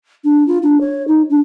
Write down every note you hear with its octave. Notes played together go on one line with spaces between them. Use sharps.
D4
F4
D4
C#5
D#4
D4